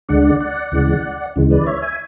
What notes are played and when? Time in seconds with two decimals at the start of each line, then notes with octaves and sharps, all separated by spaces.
0.09 D2 D3 G#3 D4 D5 F#5
0.40 D5 F#5
0.72 D2 C#3 E3 G#3
1.36 D2 C#3 E3 G#3
1.51 B4 D5
1.66 C#5 E5
1.82 E5 G#5